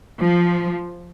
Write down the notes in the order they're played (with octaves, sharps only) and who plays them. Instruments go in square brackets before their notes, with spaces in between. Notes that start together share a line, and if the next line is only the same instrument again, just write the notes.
[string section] F3